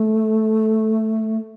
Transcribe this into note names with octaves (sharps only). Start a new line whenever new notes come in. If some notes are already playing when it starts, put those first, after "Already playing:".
Already playing: A3